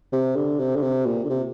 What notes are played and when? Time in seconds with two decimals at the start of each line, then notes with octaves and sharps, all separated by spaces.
0.13 C3
0.36 D3
0.60 C3
0.76 D3
0.83 C3
1.06 A#2
1.25 D3
1.29 C3